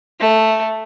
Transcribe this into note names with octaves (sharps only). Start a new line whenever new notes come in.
A3